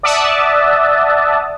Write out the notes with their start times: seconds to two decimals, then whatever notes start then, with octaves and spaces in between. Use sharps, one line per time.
0.03 D5 E5 F#5 A5 D#6